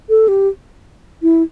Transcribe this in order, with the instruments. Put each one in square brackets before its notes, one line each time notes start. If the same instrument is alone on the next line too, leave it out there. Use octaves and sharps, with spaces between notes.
[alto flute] A4
G4
E4